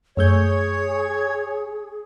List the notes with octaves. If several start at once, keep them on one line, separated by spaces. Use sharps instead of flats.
F#2 A3 G#4 C#5 G6